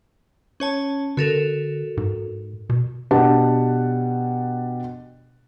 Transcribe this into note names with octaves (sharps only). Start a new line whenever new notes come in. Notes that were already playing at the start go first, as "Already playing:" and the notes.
C#4 C#5 A5
D3 F#4 A4 A#4
G#2
B2
B2 D4 G4 F#5 A5